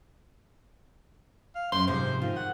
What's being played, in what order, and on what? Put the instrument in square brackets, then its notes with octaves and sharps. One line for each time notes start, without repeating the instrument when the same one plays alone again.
[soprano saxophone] F5
[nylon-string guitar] F#2 [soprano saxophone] C6
[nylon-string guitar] G#2 C3 F3 [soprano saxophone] C5
[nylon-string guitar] D#3 [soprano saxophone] F4
[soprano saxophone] F#5